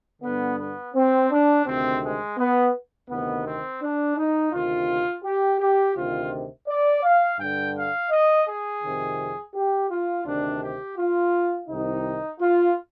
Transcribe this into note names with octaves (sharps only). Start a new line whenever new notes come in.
G2 D3 B3
B3
C4
D4
D2 C3 D#3 C4
G#3
B3
D2 C3 D#3 B3
C4
D4
D#4
D2 C3 D#3 F4
G4
G4
D2 C3 D#3 F4
D5
F5
G2 D3 G5
F5
D#5
G#4
F2 C3 D#3
G4
F4
D2 C3 D#3 D4
G4
F4
C2 C3 D#3 D#4
F4